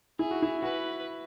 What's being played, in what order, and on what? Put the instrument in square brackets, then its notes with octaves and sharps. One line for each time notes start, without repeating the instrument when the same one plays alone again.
[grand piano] E4 [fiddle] G#4
[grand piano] F#4
E4
[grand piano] F#4 [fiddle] B4